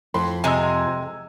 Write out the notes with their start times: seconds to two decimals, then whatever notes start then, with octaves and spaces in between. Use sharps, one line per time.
0.14 F2 B5 C6
0.44 C3 G#3 G#5 A#5 E6